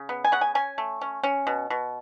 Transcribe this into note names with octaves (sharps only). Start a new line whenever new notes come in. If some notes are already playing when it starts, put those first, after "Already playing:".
Already playing: C#3
B3
G#5
C#3 F#5
G#5
C#4 G#5
A3
C#4
C#4
B2
B2